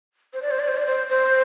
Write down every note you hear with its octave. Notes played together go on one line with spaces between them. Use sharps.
C5
D5
C5
D5
C5
D5
C5
C5